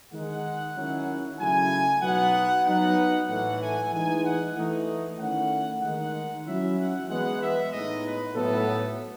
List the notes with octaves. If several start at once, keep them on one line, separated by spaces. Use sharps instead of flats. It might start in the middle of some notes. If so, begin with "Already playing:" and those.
D#3 G#3 D#4 F#5
D#3 F#3 C#4 E4
C#3 F#3 A3 E4 G#5
B2 F#3 B3 D#4 F#5
F#3 B3 D#4 F#5
A2 E3 A3 F#5
G#5
E3 G#3 D#4 G#5
F#5
E3 A3 D#4
D#3 A3 C#4 E4 F#5
D#3 G#3 D#4 F#5
F#3 C#4 E4 E5
F#5
E3 G#3 B3 F#5
E5
A2 G#3 B3 D#4 D#5
B4
A2 F#3 B3 A4